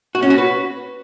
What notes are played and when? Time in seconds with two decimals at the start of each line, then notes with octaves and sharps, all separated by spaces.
0.15 F#4
0.23 C#4
0.30 F#4
0.38 B4